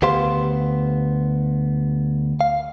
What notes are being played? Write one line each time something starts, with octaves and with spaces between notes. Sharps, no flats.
D2 B3 G4 C5 F5 C6
F5